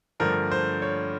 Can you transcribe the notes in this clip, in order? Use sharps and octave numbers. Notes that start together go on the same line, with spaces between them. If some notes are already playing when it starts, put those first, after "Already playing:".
G2 D3 F3 A3 D4 A#4
C5
C#5